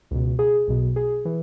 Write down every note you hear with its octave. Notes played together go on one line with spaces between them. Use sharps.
C#2 B2
G#4
B1 B2
G#4
E3